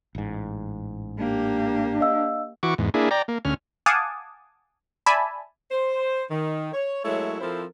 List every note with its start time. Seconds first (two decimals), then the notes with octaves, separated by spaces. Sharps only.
0.15 A1 G#2
1.19 A#3 D4 G4
2.01 D#5 F5 E6
2.63 E3 F#4 C#6 D6
2.78 E2 G#2
2.94 A#3 D4 E4 G#4
3.11 D5 G5 A#5
3.28 A#3
3.45 D2 C#4 F6
3.86 F5 F#5 G#5 A5 D6 D#6
5.06 D5 E5 G#5 A5 B5
5.71 C5
6.31 D#3
6.73 C#5
7.05 F#3 G#3 A3 E4 A#4 C#5
7.41 F3 C4 E4 A4 A#4 C5